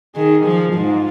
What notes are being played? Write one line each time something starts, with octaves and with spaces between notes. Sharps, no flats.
D#3 G#4
F3
G#2 F4